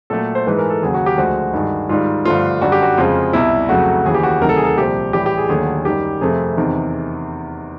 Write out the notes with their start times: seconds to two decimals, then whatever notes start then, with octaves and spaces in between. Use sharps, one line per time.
0.10 A#2 F#3 A3 A4
0.35 C5
0.47 G#2 E3 G#3 B4
0.59 A#4
0.70 A4
0.83 D#2 C#3 F#3 G#4
0.94 F#4
1.06 G4
1.18 D2 D3 F3 G#3 F#4
1.54 G2 D#3 G#3
1.89 G#2 D#3 G3 F4
2.25 G2 D3 F3 A3 F4
2.61 F#2 D3 G3 F#4
2.72 G4
2.83 F#4
2.98 F2 C#3 F3 G#3 F4
3.33 C2 B2 G3 E4
3.69 F2 C#3 F#3 A3 F#4
4.05 D#2 C#3 E3 G#4
4.14 G4
4.23 F#4
4.41 D2 C3 D#3 F#3 A#4
4.49 A4
4.57 G#4
4.65 A4
4.78 C2 A#2 F3 G4
5.13 A2 E3 G3 G4
5.26 G4
5.38 G#4
5.49 D#2 D3 F#3 A3 G#4
5.85 F#2 D#3 G3 G4
6.21 F2 C3 F3 A3 G#4
6.57 E2 C3 D#3